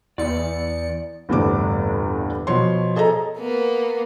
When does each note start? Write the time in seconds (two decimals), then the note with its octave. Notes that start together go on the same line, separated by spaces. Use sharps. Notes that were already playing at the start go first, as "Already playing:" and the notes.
0.18 E2 D5 C#7
1.29 G1 E2 A2 C3 G3 D6
2.47 B2 F3 C#5 C6
2.96 G#4 A4 D#5 A#5
3.38 A#3 B3